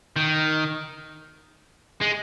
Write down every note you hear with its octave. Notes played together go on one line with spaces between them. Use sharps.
D#3
G#3